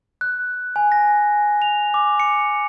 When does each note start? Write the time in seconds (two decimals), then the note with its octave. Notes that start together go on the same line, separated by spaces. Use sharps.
0.21 F#6
0.76 G#5
0.92 A#6
1.62 F7
1.94 D6
2.20 C#7